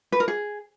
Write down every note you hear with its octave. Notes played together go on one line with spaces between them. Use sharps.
B4
A#4
G#4